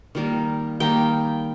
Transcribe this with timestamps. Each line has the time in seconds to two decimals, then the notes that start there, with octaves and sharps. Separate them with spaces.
0.15 D#3 G3 A#3
0.80 D#3 G3 A#3 G5